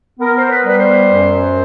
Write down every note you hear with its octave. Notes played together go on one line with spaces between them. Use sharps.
B3 A#4
C5
B4
G3 B4
C5
F#2